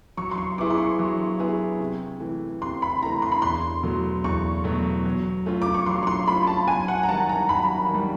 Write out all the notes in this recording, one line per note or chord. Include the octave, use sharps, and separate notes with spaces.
F#3 C#6
C6
C#6
B3 E4 G#4 D6
C6
C#6
F#3
B3 E4 G#4
C3
E3 A3
C3 C6
B5
E3 A3 A#5
C6
B5
E2 C6
B2 F#3 A3
E2 C#6
B2 F#3 A3
F#3
A3 C#4 F4
D6
C#6
F#3 C6
C#6
C6
A3 C#4 F4 B5
A5
F#2 G#5
F#5
A#5
D#3 G3 A5
A#5
F#2 B5
D#3
G3